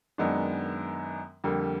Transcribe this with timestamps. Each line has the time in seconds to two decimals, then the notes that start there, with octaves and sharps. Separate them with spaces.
0.18 F#2 D#3 G#3 B3 D4
1.44 F2 D3 G3 A#3